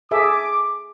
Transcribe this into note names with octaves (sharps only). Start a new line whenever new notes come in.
G#4 A4 E5 D6